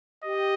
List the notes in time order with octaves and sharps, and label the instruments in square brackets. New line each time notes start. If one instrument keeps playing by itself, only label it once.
[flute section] G4 [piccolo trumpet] D#5